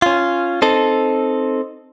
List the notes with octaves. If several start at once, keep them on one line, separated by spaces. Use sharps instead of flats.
C#4 F4
C4 D#4 A4